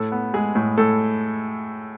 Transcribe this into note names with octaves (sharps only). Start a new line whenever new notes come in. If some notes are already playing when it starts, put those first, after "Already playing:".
Already playing: A2 A4
B3
G#3 G#4
A2
A2 A4